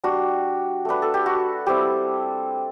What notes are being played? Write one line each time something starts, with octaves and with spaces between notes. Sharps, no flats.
G3 D4 F#4
A3 D4 B4
A4
G4
F#4
G3 C4 E4 G4